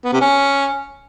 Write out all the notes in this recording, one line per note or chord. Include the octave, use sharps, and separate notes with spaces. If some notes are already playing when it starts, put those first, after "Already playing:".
B3
C3
C#4